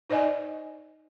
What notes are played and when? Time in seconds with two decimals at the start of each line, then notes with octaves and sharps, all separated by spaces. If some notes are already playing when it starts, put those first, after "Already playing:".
0.10 D#4 C5 D5 D#5 G#5